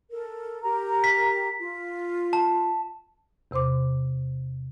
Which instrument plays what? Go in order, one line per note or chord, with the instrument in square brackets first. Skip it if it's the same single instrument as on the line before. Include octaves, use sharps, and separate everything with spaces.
[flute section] A4 A#4
G4 A#4 A#5
[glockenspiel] B6
[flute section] F4
[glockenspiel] A5
[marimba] E2 C3 C5 C6 D6